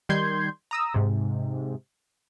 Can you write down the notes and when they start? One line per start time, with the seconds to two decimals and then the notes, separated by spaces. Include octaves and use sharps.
0.09 D#3 G3 C6 G6 G#6
0.71 A#5 D#6 E6
0.94 G#2 C3